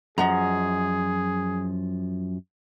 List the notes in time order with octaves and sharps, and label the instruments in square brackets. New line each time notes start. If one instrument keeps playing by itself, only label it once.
[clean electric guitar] F#2 F3 [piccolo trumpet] G#4 [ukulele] D#5 F#5 A#5